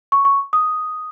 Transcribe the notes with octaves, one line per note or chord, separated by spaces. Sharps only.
C#6
C#6
D#6